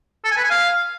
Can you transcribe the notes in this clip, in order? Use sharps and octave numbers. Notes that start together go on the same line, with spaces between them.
A4
G#5
B4
G#5
F5